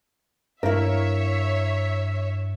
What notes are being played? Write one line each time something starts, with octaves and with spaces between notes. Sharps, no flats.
G2 A#3 E4 A#4 C#5 E5